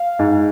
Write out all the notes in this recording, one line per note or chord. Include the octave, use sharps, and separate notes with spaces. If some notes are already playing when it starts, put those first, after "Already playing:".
Already playing: F5
G#2